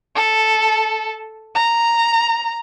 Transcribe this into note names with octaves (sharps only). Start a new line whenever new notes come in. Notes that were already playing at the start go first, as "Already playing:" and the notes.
A4
A#5